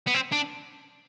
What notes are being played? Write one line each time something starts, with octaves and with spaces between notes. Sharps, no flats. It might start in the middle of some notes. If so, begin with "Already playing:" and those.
B3
C4
D4